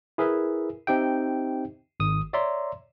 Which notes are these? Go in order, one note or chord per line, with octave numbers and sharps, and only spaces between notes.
E4 G#4 A#4 B4 E5
C4 D#4 G4 E5 G5
G#1 D#6
C#5 D5 E5 A#5 C6